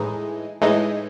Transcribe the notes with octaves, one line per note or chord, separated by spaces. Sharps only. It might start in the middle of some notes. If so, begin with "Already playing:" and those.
Already playing: A2 E3 G#3 D#4
A2 E3 G#3 D#4